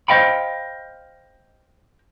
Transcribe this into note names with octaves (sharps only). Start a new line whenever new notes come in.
C5 D#5 F5 G5 B5